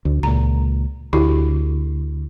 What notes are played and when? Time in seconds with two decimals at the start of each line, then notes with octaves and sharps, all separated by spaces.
0.05 D2
0.23 C#2 A#2 A#5
1.13 D2 E4 F#4 G4